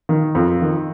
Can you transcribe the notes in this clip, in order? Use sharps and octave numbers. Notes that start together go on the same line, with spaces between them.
D#3
F2
D#3